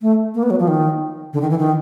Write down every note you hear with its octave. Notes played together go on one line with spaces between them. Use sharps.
A3
A#3
B3
F#3
F3
D#3
D3
D#3
E3
D#3